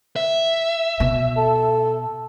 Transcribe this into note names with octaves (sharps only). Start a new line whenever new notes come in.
E5
B2
A4